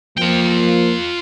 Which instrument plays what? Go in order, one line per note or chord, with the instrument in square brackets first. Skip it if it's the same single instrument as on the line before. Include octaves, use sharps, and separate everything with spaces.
[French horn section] F3 A#3 [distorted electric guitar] F4 G5